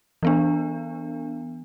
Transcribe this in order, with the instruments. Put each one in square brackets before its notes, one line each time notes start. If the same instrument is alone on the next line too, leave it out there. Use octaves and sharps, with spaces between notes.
[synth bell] E3 B3 D4